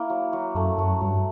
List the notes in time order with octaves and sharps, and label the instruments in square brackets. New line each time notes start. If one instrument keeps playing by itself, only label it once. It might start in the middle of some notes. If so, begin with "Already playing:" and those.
Already playing: [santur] A#3 E4
F#3
F#3
[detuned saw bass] F#2 [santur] A3
[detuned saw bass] F#2 [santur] F#3
[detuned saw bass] G2 [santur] F#3